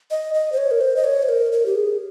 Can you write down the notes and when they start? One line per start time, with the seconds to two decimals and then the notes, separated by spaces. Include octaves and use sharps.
0.11 D#5
0.34 D#5
0.52 C5
0.58 C#5
0.71 A#4
0.81 C5
0.96 D#5
1.04 C#5
1.23 C5
1.29 A#4
1.52 A#4
1.66 G4
1.75 G#4